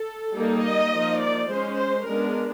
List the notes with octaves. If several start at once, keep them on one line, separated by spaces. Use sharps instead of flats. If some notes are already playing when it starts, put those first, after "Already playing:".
Already playing: A4
G3 A#3 D#4
D#5
F3 A#3 D#4
D5
G#3 C#4 C5
C5
G#3 B3 D4 A#4